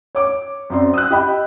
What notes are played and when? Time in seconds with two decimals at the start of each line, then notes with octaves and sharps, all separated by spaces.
0.15 C#5 D6
0.70 F#2 C4 D5 C6
0.94 D#6 E6 F#6
1.10 G4 D#5 G5 B5